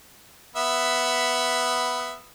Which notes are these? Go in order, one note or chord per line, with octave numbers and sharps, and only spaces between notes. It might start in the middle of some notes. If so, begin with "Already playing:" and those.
B3 E5